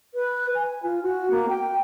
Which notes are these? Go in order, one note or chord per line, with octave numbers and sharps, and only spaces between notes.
B4
G#5
F4
F#4
A#3
G5